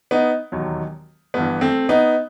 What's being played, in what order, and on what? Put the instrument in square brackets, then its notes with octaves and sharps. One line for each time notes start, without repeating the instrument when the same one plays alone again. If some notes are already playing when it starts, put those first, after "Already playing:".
[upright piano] B3 D#4
E1 D#2 D#3 F#3
G1 G2 E3 B3
A3 C4
B3 D#4